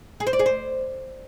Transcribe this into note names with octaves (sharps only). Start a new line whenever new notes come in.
G#4
C5
D5
G#4
C5